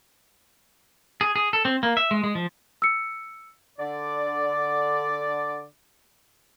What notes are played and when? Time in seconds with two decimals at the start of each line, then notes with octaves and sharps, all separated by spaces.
1.21 G#4
1.36 G#4
1.53 A4
1.65 C4
1.83 A#3
1.97 E5
2.11 G#3
2.24 G#3
2.35 F3
2.82 E6 C#7
3.79 D3 D5